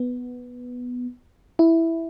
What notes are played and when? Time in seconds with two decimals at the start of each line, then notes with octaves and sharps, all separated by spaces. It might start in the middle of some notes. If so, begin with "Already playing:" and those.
Already playing: B3
1.59 E4